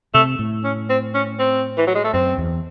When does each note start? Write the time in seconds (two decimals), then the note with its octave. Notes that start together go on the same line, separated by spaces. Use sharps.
0.14 C3 A3
0.39 A2
0.64 C#4
0.89 C4
1.14 C#4
1.39 C4
1.77 E3
1.87 F#3
1.95 G#3
2.04 A3
2.13 F#2 C4
2.38 E2